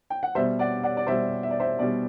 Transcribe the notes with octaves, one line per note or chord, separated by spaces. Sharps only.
G5
F#5
B2 G3 C5 E5
D5 F#5
D5 F#5
D5
B2 G3 C5 E5
E5
D5
C5 E5
B2 G3 D5